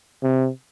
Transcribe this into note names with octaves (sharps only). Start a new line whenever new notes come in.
C3